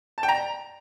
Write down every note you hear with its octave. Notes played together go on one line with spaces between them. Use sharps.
A5
G5
A#5